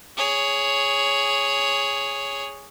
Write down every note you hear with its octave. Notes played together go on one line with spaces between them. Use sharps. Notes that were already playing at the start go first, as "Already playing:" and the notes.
G#4 C#5